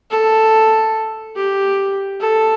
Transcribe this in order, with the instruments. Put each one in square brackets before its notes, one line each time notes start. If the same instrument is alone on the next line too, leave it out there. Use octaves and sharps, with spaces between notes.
[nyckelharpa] A4
G4
A4